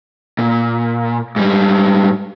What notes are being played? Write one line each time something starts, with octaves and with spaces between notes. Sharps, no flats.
A#2
G#2 G3